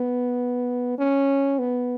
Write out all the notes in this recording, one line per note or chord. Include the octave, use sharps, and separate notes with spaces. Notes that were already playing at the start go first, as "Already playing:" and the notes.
Already playing: B3
C#4
B3